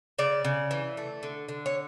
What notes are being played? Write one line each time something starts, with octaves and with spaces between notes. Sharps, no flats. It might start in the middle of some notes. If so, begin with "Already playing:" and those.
C#3 D5
C#3
E3
A3
D3
D3
C#5